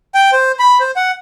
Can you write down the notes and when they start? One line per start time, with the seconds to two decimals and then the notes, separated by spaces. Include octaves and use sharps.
0.15 G5
0.32 C5
0.59 B5
0.80 C5
0.96 F#5